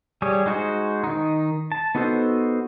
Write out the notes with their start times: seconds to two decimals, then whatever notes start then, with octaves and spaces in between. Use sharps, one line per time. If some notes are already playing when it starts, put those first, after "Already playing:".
0.22 G3 G#4 C#5
0.46 G#3 D#4 F#4 G#4 C5
1.04 D#3 D#4
1.72 A5
1.95 B3 D#4 F#4 A4 C5